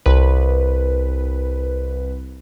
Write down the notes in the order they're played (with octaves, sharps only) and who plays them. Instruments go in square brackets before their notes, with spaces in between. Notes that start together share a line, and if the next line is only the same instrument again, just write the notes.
[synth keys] C2 B4